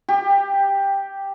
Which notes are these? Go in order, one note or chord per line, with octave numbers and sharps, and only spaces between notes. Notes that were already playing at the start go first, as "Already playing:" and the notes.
G4